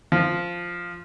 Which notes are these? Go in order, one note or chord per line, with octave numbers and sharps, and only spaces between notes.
F3